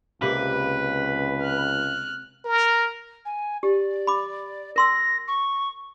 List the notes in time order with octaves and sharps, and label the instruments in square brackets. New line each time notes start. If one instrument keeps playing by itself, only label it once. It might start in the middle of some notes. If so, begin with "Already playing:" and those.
[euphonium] C#2 [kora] C3 A#3 [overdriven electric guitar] B4
[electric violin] F6 F#6
[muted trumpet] A#4
[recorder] G#5
[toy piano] G4 [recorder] D5
[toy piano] B5 D6
[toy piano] A#4 C6 E6 [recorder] A#6
[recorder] C#6